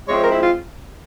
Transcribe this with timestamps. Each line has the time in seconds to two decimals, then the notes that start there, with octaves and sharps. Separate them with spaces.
0.09 F3 G#3 C4 E4 C#5
0.20 A#4
0.31 E4
0.41 F4